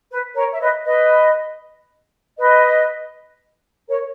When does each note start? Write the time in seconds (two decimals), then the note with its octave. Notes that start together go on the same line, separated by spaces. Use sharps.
0.09 B4
0.34 A#4 C#5
0.51 E5
0.60 B4 D#5
0.85 B4 D#5
2.37 B4 D#5
3.87 A#4 C#5